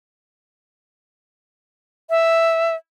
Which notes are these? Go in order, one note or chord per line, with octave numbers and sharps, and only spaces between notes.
E5